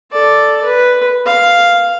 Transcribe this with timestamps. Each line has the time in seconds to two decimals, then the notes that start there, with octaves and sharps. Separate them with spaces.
0.12 A4 D5
0.65 B4
1.26 F5